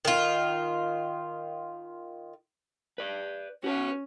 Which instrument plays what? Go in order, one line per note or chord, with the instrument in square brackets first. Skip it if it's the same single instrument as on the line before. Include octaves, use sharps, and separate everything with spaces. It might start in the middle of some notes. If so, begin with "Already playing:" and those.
[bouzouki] D#3 F4
[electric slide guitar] B4 D5
[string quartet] C#4 [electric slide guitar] F#4 B4 C#5